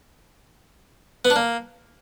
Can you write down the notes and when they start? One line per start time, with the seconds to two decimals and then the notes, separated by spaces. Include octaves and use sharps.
1.25 B3
1.30 D4
1.36 A#3